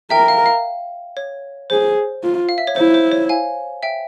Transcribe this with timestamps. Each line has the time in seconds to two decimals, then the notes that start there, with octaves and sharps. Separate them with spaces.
0.10 A#4 E5 G5
0.28 F5
0.46 F5
1.17 C#5
1.70 G#4 C5
2.23 F4
2.49 F5
2.58 E5
2.67 C#5
2.76 E4 C5
2.94 C5
3.12 C#5
3.29 F5 G#5
3.83 E5 G5